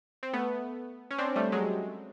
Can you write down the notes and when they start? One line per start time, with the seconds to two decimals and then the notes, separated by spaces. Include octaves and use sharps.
0.23 C4
0.33 A3 B3
1.11 C#4
1.18 C4 D4
1.36 G3 A3
1.52 F#3 G#3